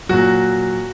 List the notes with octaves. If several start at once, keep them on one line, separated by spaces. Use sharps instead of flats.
A#2 F#3 F#4